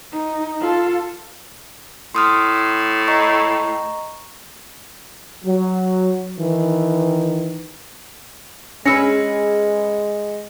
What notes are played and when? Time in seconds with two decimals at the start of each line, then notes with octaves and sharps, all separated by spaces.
0.11 D#4
0.60 F4 A4
2.15 A2 C6 D#6 F6
3.08 D#5 A#5 C#6
5.44 F#3
6.38 D#3 E3
8.86 G#3 C#4 G#4 B4 E6 A#6 C#7